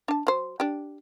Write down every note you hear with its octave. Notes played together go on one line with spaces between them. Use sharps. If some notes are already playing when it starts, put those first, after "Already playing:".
D4 A5
F#3 C5
D4 G4